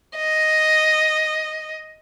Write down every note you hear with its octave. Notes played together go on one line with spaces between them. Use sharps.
D#5